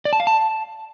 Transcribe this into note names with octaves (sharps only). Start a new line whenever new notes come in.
D5
A5
F5
A5